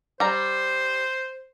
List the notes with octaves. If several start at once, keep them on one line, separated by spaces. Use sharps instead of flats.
G3 C5 A#5